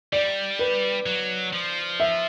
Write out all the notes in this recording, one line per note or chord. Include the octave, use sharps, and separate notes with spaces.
G3 D5
B4
F#3
F3
E5